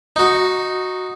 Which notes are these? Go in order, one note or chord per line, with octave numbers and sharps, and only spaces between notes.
D#4 F#4